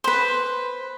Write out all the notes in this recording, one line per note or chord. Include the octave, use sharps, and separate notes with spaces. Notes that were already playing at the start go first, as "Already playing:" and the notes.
B4 C5